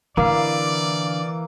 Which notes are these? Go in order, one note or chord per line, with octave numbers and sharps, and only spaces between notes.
D3 E3 A#3 E4 D5 F5